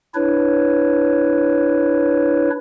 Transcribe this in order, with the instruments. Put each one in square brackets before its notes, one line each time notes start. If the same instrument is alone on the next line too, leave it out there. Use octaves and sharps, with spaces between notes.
[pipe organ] D4 E4 B4 C#5